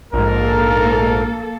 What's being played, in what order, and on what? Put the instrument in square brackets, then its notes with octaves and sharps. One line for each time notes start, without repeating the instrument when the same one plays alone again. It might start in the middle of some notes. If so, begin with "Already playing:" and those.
[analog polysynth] A#1 G#2 [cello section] A#3 A4 [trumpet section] A#4